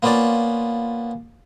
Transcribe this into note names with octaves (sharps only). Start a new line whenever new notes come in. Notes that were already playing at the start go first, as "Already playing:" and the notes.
A#3 B3 C#4 F4 D5